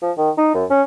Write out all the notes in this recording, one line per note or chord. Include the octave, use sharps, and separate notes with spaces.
F3
D#3
D#4
F#2
C#4